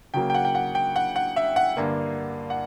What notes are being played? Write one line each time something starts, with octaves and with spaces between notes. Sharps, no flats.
C#3 F#3 A#3 G5
G5
F#5
G5
F#5
G5
F#5
F#5
E5
F#5
G2 D3 A#3
F#5